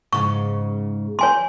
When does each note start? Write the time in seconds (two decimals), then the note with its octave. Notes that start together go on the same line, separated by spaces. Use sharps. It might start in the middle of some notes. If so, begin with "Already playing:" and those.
0.13 G#2 C#3 C#6
1.19 C#5 G#5 C6